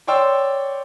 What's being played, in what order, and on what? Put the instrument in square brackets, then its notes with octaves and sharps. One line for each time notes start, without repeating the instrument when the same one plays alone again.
[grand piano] C#5 D5 G5 C6 E6